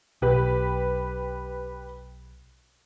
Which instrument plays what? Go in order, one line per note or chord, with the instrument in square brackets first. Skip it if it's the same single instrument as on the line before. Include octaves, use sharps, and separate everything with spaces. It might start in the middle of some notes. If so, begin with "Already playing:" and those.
[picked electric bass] B1 [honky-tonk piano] G4 B4